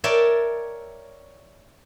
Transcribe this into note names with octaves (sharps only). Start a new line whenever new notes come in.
A#4 C#5 D5 E5 G5 A5